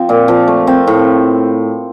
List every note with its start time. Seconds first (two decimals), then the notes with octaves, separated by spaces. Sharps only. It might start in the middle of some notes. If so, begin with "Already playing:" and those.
Already playing: F3 C4
0.09 A#2
0.28 F3
0.48 A3
0.67 C4
0.87 A2